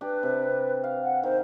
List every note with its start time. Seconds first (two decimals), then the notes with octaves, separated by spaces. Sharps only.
0.01 D4 G4 B4
0.23 C3
0.84 F5
1.03 F#5
1.23 D#3 C5